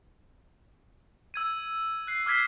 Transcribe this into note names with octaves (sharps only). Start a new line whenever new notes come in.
E6 G#6 D#7
F#6 C7
D6 F6 G#6 B6 C7